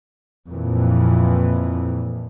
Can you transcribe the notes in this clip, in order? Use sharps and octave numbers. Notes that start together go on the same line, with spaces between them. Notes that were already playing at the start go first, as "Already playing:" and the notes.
F2 A#2 E3